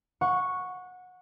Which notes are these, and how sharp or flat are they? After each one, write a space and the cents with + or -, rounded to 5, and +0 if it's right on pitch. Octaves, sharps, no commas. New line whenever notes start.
F#5 -20 C#6 +0